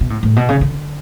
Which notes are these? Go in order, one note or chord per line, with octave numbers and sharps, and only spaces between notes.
B2
A2
A2
B2
C#3
D3